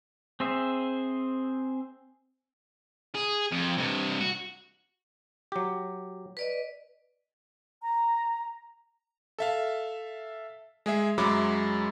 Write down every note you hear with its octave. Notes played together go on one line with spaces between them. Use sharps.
C4 G#4 C5 E5
G#4
F2
G2 C3
F#4
F#3 G4
B4 D5 D#5
A#5
A4 E5 F5
G#3 G#4 E5
F#2 F#3 G#3 E5 B5 D6